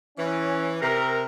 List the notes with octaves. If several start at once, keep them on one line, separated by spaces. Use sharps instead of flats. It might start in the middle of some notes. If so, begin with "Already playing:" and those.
E3 C#4
C3 A#4